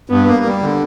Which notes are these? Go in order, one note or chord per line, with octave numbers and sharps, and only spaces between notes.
G2 B3
A#3
G3
D3